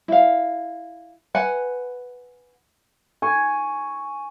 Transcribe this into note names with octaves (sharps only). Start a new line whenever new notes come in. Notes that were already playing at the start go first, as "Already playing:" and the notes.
E4 F5
B4 F#5 G#5
G#5 C#6